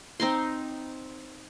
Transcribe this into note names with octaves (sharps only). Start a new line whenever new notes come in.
C4 D#4 A#5 C6